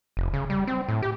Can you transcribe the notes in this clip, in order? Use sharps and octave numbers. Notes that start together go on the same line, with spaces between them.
F1
C#3
G3
C4
A2
G4